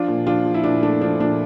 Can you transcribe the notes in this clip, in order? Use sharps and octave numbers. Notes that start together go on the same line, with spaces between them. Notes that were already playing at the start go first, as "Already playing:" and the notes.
Already playing: F3 D4 F4
A#2
F3 D4 F4
F3
E4
A#2 D4
A3 D4
F3 D4
A#2 D4